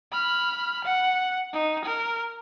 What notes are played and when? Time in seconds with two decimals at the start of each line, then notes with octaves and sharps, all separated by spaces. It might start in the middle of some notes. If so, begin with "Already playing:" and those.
0.12 B5 F6
0.85 F#5
1.53 D#4
1.85 A#4